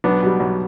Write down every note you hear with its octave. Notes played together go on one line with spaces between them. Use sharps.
B1 B3 D4
B2 G3
B1